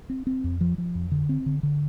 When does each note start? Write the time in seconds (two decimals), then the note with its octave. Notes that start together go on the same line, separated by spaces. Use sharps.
0.10 C4
0.27 C4
0.44 F2
0.61 F3
0.78 F3
0.95 F2
1.11 D3
1.29 C4
1.46 D3
1.63 D3